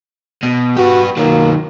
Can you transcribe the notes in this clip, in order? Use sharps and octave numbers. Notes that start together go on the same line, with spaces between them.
B2
F#4 G4 B4
D#3 F#3 A#3